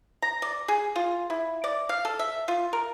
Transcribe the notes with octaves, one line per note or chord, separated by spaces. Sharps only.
A#5
D5
G#4
F4
E4
D5
F5
A4
E5
F4
A#4